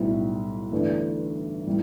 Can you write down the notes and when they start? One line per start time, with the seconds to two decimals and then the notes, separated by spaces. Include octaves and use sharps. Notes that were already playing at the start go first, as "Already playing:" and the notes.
Already playing: B1 A2 G3 E4
0.71 G1 G2 E3 A3 D4
1.67 A2 G3